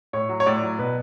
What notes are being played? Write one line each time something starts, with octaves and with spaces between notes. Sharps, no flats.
A2 C#5
F#3
C#5
A2 D5
F#3
B2 B4